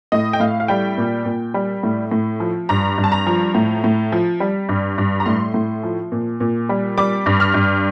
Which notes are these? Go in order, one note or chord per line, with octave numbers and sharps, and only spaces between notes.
A2 D#5
G5
A2 F5
F5
G3 G5
A#2
A#2
G3
A2
A2
F3
G2 A#5
G2
A5
A#5
F3
A2
A2
F3
G3
G2
G2
A#5
A2 C6
A2
F3
A#2
A#2
G3
G3 D6
G2
F6
G2